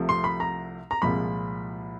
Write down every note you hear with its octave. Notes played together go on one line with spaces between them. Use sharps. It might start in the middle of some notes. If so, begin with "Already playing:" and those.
Already playing: C2 C3 F3 A3
C6
B5
A#5
A#5
C2 A#2 F3 G#3 B5